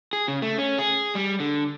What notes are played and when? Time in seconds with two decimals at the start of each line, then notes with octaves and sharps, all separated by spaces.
0.13 G#4
0.28 C#3
0.42 A3
0.59 C#4
0.79 G#4
1.15 G3
1.40 D3